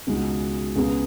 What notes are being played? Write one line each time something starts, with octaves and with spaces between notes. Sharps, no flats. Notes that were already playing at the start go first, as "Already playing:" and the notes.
C#2 B2 G#3 D#4 F#4
C#2 C#3 B3 G#4